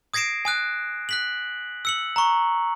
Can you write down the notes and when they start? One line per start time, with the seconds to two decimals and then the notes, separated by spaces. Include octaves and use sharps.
0.14 D#6 G#6 A#6 C7 D7 E7
0.45 G#5 D#6 F#6
1.09 F#6 B6 F#7
1.85 E6 C#7 F#7
2.16 A#5 C#6